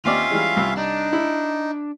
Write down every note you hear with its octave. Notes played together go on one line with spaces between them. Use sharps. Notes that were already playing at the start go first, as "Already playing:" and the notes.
D#2 C4 C#4 F4 D5 E5 F5
E3 G3 G#3
C2 E6
D4 D#4
E4